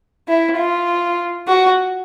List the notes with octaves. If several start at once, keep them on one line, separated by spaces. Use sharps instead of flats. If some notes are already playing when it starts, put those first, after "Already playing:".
E4
F4
F#4